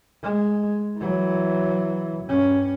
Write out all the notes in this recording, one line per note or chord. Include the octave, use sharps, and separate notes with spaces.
G#3
E3 F#3
G2 C#4